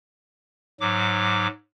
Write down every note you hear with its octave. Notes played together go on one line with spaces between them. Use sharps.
G#2 F#3 D6